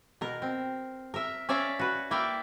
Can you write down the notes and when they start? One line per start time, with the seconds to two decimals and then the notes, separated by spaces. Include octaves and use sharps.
0.21 B2 A#4
0.42 C4
1.14 A#4 E5
1.49 C#4 D5 E5 F5 A#5
1.79 F#4 B4
2.11 A#3 E4 D5 E5 F5 G5